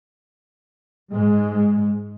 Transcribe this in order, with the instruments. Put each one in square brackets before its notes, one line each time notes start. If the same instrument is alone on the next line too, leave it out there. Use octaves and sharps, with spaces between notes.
[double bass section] G#2 G#3